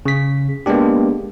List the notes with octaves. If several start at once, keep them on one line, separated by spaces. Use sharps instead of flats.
C#3 B6
G#3 A#3 B3 D4 G4